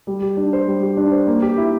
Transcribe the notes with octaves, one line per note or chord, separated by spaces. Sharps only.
G3
G4
D4
C5
G3
G4
D4
C5
A#3
G4
E4